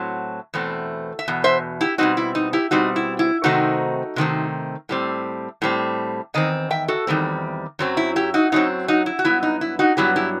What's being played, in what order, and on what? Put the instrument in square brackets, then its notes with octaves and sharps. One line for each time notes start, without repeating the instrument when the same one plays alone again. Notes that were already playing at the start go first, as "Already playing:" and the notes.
Already playing: [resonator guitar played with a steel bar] A2 F#3 C4
E2 B2 A3 C4
E5
E2 B2
C5 E5
E4 G4
B2 G3 C4 D#4 F#4
E4
D#4
E4 G4
B2 G3 C4 D#4 F#4
E4
E4
C3 D#3 A3 C4 D#4 F#4
C3 D#3 A3 C4
A2 G3 C4
A2 G3 C4
E2 D#3 C4 D#5
E5 G5
F#4 A4
E2 D#3 G3 C4
F#2 F#3 C4
E4
E4 G4
D#4 F#4
F#2 F#3 C4 D#4
D#4 F#4
E4
F#4
G2 F#3 B3 E4
D#4
E4
D#4 F#4
G2 F#3 B3 E4 G4
E4 G4